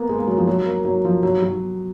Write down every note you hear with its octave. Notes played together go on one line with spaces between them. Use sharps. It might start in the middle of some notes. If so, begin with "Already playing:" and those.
Already playing: A#3 B3
G#3
A#3
F#3
F3
F#3
A#3
F#3
F3
F#3
F#3